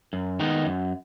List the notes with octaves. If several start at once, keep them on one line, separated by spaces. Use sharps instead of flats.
F#2
D#3 G#3 B3 D#4
F#2